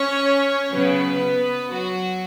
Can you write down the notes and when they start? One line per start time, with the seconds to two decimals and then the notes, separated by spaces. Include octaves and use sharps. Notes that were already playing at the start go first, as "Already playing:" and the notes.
Already playing: C#4 C#5
0.72 C#3 F#3 B3 B4
1.71 F#3 F#4